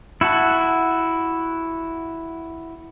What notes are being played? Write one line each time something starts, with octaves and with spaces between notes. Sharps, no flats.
E4 F#4 F#5 A5